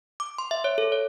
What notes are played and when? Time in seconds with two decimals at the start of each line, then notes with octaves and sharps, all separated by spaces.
0.20 D6
0.38 C6
0.51 E5
0.64 C#5
0.78 A4
0.92 C#5